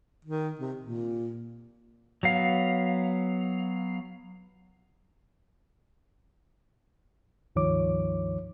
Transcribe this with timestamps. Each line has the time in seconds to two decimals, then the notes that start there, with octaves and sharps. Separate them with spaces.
0.25 D#3
0.59 C3
0.81 A#2
2.23 F#3 B3 F5
7.56 C#2 G2 D#3 F3 C#5 D6